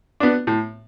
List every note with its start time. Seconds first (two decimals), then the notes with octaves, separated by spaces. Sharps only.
0.20 B3 D4
0.47 A2